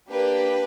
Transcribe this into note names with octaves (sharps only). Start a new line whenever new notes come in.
A#3 D4 G4 B4